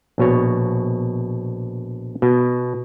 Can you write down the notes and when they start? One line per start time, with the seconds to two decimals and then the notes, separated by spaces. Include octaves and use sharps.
0.18 A#1 B2 C#5
2.22 B2